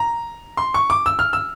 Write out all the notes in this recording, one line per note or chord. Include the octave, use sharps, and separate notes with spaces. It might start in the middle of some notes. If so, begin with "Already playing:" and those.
Already playing: A#5
C6
C#6
D6
E6
F6
E6